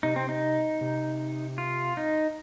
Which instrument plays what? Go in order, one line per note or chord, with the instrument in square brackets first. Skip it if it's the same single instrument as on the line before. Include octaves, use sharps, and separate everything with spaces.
[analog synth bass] C3 [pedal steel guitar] D#4
[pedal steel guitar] C4
D#4
[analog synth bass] C3
[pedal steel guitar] F4
D#4